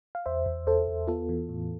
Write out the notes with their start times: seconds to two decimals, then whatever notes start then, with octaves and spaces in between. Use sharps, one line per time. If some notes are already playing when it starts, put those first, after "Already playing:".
0.15 F5
0.26 E2 C5 E5
0.46 E2
0.67 E2 A4 C5
0.88 E2
1.07 B3 F4 A4
1.29 E3
1.49 A2